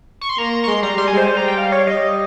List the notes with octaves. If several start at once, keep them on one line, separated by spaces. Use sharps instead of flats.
C#6
C6
A#3 A#5
C#6
G#3 C6
G3 A#5
G3 C6
G#5
G#3 C5
G3 C5
A#5
G5
F5
C#5
G3 D#5